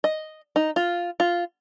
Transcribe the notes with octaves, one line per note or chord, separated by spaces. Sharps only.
D#5
D#4
F4
F4